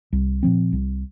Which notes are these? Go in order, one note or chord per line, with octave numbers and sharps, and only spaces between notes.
C2
A#2 F3 C4
C2